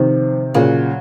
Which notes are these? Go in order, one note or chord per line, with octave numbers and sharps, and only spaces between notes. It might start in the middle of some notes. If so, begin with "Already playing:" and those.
Already playing: C3 D#3 F3
A#2 C#3 F#3